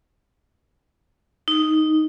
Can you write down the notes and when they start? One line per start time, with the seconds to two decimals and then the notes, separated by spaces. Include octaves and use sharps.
1.48 D#4